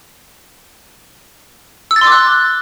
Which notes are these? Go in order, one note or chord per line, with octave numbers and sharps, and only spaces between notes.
E6
A6
C6
D6
F#6